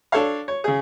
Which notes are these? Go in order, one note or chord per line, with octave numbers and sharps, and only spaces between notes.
D4 A4 C#5 F5
C#5
C#3 G#4